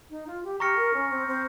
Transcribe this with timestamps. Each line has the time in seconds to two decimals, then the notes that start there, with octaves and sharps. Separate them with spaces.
0.10 D#4
0.27 F4
0.44 G4
0.60 G4 A#5 C#6 F6 A#6 C#7
0.77 A#4
0.94 C#4
1.10 C4
1.27 C4